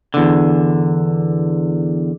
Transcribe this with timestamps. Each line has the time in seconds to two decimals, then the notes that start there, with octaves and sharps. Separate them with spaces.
0.14 E2 D3